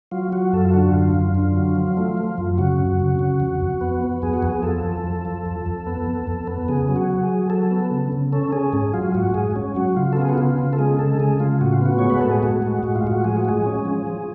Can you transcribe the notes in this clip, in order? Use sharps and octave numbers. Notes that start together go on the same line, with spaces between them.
F#3 F4
F#3 F#4
F#2 A4
F4
D3 F#4
F#2 F4
F#2
D3
F#3
F3
A3
F3
F#2
C#3 F#4
F#2
C#3
C#3
F2
F2
B3
B3
F2 G#4
F#4
F2 G#4
F3 A4
F2
F3
F3
F2
F2
B3
F2
F2
B3
C#3 G#4
F#3
F#4
F#3
G#4
F#3
F#3 A4
B3
C#3
C#3
C#4 A4
C#4 G#4
G#2 G#4
F#3 F4
G#2 F#4
G#2 G#4
C#4
F#3 F#4
C#3 F4
A4
B3 G#4
F#4
C#3 F4
C#3
A4
G#3 G#4
C#3 A4
C#3 G#4
C#3 F4
A2 F#4
F4
B3 F#4
G#3 C#5
B4
A2 A4
G#4
A2 F#4
G#3
A2 F#4
F4
A2 F#4
F3 G#4
F#4
G#3 G#4
C#4
F3
F3